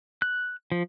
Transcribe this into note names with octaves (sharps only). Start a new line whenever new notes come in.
F#6
F3